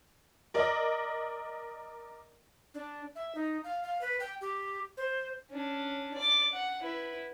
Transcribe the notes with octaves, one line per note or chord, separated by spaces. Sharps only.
A#4 D5 D#5
D4
E5
D#4
F5
F5
B4
G5
G4
C5
C#4 D4
D5 D6
F#5
E4 B4